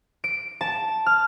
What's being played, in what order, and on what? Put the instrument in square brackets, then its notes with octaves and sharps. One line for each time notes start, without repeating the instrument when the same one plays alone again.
[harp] D7
A5
F6